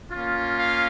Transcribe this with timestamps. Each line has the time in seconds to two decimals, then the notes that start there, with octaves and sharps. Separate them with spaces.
0.12 A#3 C#4 F4
0.58 F5